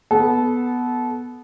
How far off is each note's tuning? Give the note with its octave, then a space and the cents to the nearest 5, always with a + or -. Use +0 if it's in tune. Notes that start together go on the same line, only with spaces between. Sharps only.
B3 +0 A4 -20